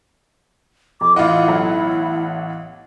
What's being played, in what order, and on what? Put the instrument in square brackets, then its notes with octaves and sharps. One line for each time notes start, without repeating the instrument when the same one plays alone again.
[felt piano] F2 [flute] D6
[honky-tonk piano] A1 F5 F#5 [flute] E4 [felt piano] F4 D#5
[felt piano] B1